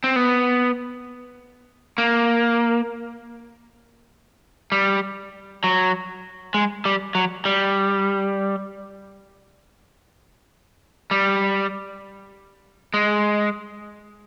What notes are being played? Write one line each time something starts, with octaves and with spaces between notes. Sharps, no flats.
C4
B3
A#3
G3
F#3
G#3
G3
F#3
G3
G3
G#3